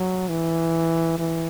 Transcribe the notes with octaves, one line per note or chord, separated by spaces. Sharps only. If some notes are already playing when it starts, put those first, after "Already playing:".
Already playing: F#3
E3
E3